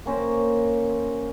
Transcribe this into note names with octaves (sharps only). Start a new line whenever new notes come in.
A#3 C#4 A#4 C5